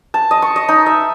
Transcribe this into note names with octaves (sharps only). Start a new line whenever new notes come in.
A5
D#5
C#6
D#5
D#4
E5